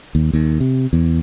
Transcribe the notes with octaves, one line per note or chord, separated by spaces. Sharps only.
D#2
D#2
C3
E2